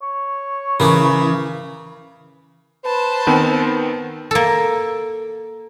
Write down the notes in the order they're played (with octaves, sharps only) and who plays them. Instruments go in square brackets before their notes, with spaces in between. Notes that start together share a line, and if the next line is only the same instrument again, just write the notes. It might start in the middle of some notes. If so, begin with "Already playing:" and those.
[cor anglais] C#5
[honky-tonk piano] C#3 [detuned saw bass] E3 [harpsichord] A#4 B4 D6
[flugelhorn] B4 [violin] C5 A5
[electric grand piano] D#3 B3 C4
[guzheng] A#3 A4